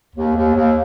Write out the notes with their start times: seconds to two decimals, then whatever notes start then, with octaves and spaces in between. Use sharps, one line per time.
0.15 D#2
0.35 D#2
0.55 D#2